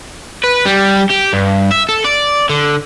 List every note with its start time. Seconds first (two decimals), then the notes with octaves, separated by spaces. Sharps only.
0.44 B4
0.65 G3
1.10 G4
1.33 G2
1.71 E5
1.89 A4
2.04 D5
2.50 D3